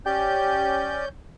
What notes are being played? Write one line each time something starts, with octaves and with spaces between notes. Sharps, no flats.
C#4 G4 D5 G6